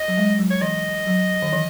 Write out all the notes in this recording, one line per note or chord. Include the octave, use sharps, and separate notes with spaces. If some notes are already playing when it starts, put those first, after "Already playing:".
Already playing: D#5
F#3
G#3
F#3
C#5
E3 D#5
F#3
D#3
E3